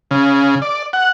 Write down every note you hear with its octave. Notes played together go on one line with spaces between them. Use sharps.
C#3
D5
F#5